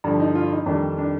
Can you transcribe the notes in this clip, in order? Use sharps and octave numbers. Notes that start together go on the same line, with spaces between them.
G2 D3 F3
D#4
F4
D#4
F2 D#3 G3 D4
D4